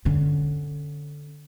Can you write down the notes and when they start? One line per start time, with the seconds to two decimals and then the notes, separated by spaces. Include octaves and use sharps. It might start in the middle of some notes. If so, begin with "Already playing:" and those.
0.05 D3 C#4